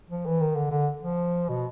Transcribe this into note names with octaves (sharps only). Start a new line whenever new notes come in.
F3
E3
D#3
D3
D3
F3
B2